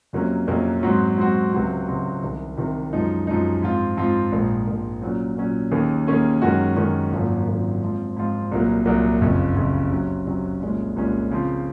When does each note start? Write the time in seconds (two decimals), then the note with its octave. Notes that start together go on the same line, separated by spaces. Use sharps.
0.13 F2 C3 F#3 A#3 C#4
0.47 F2 C3 F#3 A#3 C#4
0.83 G#2 F#3 C4 F#4
1.18 G#2 F#3 C4 F#4
1.53 C#2 C3 F#3 C4 F#4
1.87 C#2 C3 F#3 C4 F#4
2.23 C2 C3 D#3
2.57 C2 C3 D#3
2.93 F#2 F3 G#3 D#4
3.27 F#2 F3 G#3 D#4
3.62 G#2 F3 C4 F4
3.97 G#2 F3 C4 F4
4.32 A#1 G#2 F3 A#3
4.67 A#1 G#2 F3 A#3
5.02 A#2 F#3 C#4
5.37 A#2 F#3 C#4
5.71 D#2 D#3 A#3 C#4 G#4
6.07 D#2 D#3 A#3 C#4 G#4
6.42 F#2 D#3 G#3 C#4 F#4
6.76 F#2 D#3 G#3 C#4 F#4
7.12 G#1 F#2 F3 A#3
7.47 G#1 F#2 F3 A#3
7.82 G#2 F3 C4 F4
8.17 G#2 F3 C4 F4
8.51 C2 A#2 F#3 A#3
8.86 C2 A#2 F#3 A#3
9.21 F#1 F2 C#3
9.56 F#1 F2 C#3
9.90 C3 F#3 C#4
10.26 C3 F#3 C#4
10.61 C2 A#2 G#3 C#4
10.96 C2 A#2 G#3 C#4
11.31 C#3 F3 C4